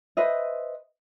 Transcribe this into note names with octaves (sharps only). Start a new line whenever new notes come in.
B4 C5 D#5 E5